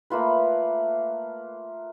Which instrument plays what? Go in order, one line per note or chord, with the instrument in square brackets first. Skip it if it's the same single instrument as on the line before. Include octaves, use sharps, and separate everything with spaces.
[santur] A3 A#3 F4 B4